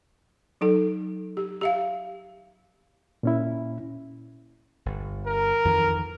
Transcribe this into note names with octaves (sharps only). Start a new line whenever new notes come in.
F#3 D#4 A4
G4
G4 E5 F5
A#2 C#4 E4
G1
A#4
F2 D#3 E3